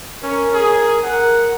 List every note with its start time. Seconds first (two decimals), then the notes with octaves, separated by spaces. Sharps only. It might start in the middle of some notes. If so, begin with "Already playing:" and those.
0.23 C#4 A#4
0.54 G#4
1.03 A#4 F#5